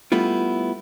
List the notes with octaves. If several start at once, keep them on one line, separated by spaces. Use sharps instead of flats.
G3 A3 B3 E4 F4